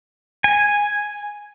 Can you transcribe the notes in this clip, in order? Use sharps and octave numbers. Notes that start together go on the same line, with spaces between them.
G#5